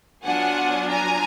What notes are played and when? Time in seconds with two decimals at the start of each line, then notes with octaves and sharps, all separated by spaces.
0.25 F#3 B3 D4 F4 F#5 G#5
0.90 G#5 A#5